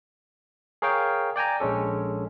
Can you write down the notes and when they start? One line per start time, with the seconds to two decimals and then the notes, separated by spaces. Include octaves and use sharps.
0.82 G#4 A#4 C#5 F5 G5
1.36 D5 G5 G#5 A#5
1.60 A#1 G#3 C#4 A4